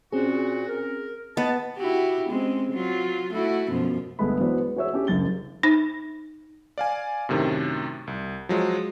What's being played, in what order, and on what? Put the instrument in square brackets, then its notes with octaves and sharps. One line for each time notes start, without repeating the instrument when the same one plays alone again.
[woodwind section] A#2 F#4 [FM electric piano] C4 C#4 G#4
[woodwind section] A#4
[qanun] B3 [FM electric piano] D#5 [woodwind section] A5
[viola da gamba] E4 F#4 G4
G#3 C4 C#4
F#3 F4
A3 E4 F#4
F#2 B2 F3
[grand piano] G1 G#3 A3 B3 B5
E3 F#3 G#3 B3 C5 D5
B4
F#4 G#4 C#5 E5 E6
C#4 D4 G4
F#1 F#2 A6 G7
[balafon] D#4
[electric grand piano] D5 F5 G#5
F#2 A2 C3 D#3
C2
F3 F#3 G#3